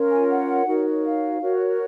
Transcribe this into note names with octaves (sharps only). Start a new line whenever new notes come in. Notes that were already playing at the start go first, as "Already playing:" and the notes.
Already playing: C#4 F4 A#4 C#5
G#5
F#5
D#4 F#4 A#4 C#5
F5
F#4 A#4 C#5